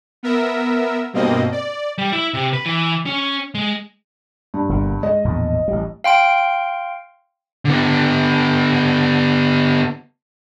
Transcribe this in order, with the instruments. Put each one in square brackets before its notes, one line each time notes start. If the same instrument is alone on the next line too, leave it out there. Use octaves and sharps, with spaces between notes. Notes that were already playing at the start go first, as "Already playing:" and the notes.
[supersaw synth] B3 A#4 E5
G2 B2 A#3 C4 D#5
D5
[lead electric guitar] G3
E4
C3
B4
E3
C#4
G#3
[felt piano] G2
[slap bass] G1 A#2
[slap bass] G#3 [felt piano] D#5
[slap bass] A#1 E2 A2
A1 G3
[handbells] F5 G5 C6 D7
[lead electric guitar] D3 B3